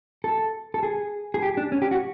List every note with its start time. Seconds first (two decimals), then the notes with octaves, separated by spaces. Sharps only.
0.24 A4
0.74 A4
0.83 G#4
1.34 G#4
1.43 G4
1.57 D4
1.72 C#4
1.82 G4
1.91 F#4